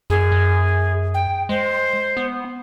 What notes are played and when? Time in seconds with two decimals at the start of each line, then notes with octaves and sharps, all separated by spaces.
0.10 F#2 G#4
0.32 F#2
1.14 G5
1.49 G#3 C5
2.17 B3